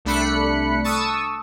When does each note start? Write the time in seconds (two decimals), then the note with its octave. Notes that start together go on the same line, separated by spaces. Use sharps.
0.05 C2 A3 D4 B5 F#6 C#7
0.84 A5 C#6 D#6 E6